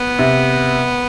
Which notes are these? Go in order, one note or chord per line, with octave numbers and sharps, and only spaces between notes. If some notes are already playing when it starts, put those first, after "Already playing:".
Already playing: B3
C3